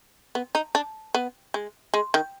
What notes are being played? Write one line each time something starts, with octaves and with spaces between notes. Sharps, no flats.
B3
D#4
D4
B3
G#3
G#3
D#3